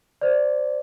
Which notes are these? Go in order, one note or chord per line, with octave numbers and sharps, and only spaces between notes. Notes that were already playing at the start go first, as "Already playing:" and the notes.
C5 D5